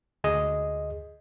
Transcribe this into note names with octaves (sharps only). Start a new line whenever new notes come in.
D2 G#4 D#5